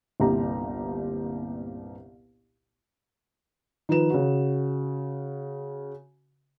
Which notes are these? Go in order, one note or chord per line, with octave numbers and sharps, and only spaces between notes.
G1 C2 A#2 G4 A#5
D#3 F3 B4 E7
C#3 F#4